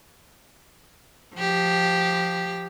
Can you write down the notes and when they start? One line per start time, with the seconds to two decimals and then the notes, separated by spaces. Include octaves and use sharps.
1.35 F3 G4